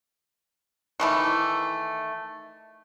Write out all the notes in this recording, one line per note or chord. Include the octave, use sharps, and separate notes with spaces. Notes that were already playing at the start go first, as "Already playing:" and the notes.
D#3 E3 A3